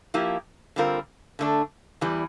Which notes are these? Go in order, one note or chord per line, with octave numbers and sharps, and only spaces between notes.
F3 A#3 E4 G4
D3 G3 C4 F4 A#4
D3 A3 D4
E2 E3 G3